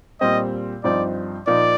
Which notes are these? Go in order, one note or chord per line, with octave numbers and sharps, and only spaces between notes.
A#2 G3 C4 D#5
G2 F3 C4 D#4 D5
A#2 F3 A#3 D#4 D5